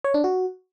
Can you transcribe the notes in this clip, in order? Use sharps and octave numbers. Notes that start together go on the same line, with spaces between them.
C#5
D4
F#4